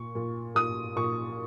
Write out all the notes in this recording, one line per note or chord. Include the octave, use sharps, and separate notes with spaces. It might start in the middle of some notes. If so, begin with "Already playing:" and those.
Already playing: A#2 C#6
A#2
A#2 D#6
A#2 C#6